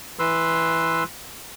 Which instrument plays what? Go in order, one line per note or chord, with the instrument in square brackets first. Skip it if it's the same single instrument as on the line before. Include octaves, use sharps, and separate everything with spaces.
[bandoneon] E3 B4 C6 E6